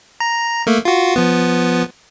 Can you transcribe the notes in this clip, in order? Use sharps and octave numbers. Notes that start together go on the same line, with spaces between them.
A#5
A3 A#3
F4 F#4
F3 B3